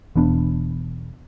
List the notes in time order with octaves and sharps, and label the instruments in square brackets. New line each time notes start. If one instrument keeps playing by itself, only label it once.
[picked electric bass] E1 E2 B3 D4